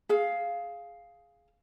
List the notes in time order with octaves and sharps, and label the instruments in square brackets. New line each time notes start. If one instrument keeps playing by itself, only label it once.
[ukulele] G#4 F5